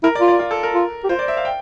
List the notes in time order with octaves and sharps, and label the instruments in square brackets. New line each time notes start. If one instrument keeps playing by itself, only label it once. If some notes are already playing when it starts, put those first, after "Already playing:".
[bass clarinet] E4 [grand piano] A#4
[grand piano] D5
[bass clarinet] F4
[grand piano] D5
F4
A4
A#4
[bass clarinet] F4
G4
[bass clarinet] F4 [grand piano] C5
[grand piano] D5
E5
F5
G5